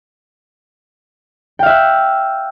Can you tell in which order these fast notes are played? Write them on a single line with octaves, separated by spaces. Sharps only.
G5 F5 E5 F#6